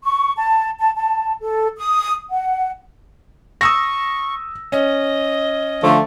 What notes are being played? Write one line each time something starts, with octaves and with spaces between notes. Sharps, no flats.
C#6
A5
A5
A5
A4
D#6
F#5
C#6 D#6 E6 A#6
C#4 D#5
D3 F3 A3